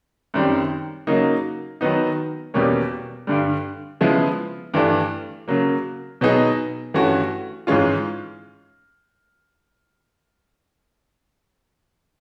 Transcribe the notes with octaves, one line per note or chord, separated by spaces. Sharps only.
F#2 D#3 G3 C4
C#3 F#3 A#3 D#4
D#3 F#3 B3 D#4
E2 B2 G3 A#3 C#4
G2 D3 G3
C#3 F3 G#3 B3 E4
G2 E3 A3 D4
C#3 F#3 A#3
B2 F#3 B3 D#4 G#4
G2 E3 A3 C#4 F#4
G#2 E3 G#3 C#4 F4